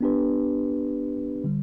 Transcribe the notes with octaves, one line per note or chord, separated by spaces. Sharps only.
B3 D4 G4 B4
D3 G3